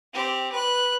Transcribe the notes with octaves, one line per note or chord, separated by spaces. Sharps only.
C4 G4
B4 F#6